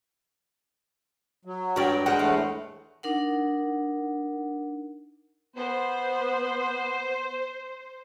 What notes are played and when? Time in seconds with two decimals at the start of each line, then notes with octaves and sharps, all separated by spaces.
1.45 F#3
1.76 G2 F#4 A#4 C#5 D5 G5
2.06 G#3 A#4 C5 F#5
2.19 E2 A2 A3 F5
3.03 D4 D#4 A#4 F#5
5.56 B3 C5